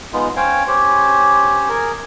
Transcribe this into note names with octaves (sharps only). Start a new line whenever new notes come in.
G#3 B3 D#4 F4
C#4 C5 C#5 F5 G5
C#4 G4 C5 C#5
G#4 A#4